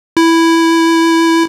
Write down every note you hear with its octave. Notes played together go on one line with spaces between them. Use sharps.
E4